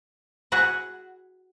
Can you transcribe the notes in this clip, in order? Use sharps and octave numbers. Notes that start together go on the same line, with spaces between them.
E4 F#4 G#4 F#5